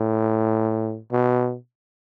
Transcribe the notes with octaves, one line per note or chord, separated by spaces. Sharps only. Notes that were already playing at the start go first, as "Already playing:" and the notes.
Already playing: A2
B2